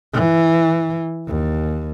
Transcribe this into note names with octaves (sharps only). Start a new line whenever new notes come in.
E3
D#2